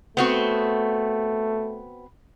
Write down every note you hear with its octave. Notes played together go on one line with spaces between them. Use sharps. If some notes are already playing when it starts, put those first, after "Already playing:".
A3 B3 C4 F#4